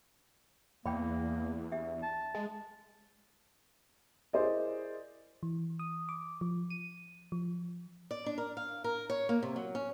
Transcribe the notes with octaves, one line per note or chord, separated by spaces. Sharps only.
E2 A#3 D5 G5 B5
D4 G4 E5
A5
G#3 G#5
E4 G#4 A#4 C5 D5 D#5
E3
D#6
D6
F3
D#7
F3
D5
D4
A#4
F5
A#4
C#5
A#3
C3
F#3
C#4